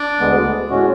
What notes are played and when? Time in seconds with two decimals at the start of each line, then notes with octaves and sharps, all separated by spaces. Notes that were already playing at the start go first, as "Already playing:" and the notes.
Already playing: D4
0.20 D2 D3 G#3 B3
0.69 A2 G#3 C#4 F#4